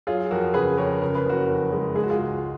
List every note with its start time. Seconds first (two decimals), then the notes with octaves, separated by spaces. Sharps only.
0.07 F#3 F4 G#4
0.31 F2 F#4 A#4
0.54 C#3 G#4 B4
0.78 F2 A#4 C#5
1.01 C#3 A#4
1.15 B4
1.26 F#1 F#4 A#4
1.49 F2
1.72 G#3
1.95 G#3 G#4
2.03 F#4
2.10 F4 G#4
2.19 C#2